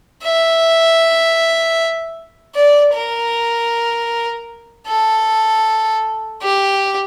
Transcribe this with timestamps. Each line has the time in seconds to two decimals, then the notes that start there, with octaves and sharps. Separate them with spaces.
0.23 E5
2.55 D5
2.93 A#4
4.87 A4
6.42 G4